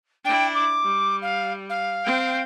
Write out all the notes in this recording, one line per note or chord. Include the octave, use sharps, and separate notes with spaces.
D4 E4 G5
D6
G3
F5
F5
C4 G5